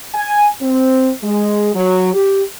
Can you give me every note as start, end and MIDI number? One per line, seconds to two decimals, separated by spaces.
0.15 0.47 80
0.61 1.10 60
1.23 1.71 56
1.75 2.12 54
2.13 2.41 67